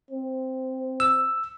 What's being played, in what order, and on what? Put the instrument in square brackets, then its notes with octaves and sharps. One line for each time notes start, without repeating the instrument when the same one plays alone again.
[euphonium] C4
[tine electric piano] E6